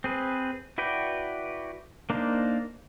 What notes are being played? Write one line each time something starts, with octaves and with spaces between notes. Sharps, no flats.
C4 G#4 B4
E4 F#4 B4 D5 G5
A#3 D4 D#4 C5